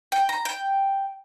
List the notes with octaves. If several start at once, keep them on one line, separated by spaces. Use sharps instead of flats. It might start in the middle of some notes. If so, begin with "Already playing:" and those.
G5
A#5
G5